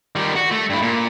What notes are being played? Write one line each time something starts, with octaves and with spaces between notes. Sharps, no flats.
D#3 G3
F#4
A3
G2 E4
A#2